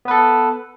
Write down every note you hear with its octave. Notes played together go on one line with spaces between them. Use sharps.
B3 A4 B4